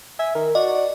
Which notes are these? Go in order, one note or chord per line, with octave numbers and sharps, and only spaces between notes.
E5 G#5
D#3 A#4
F#4 D5 D#5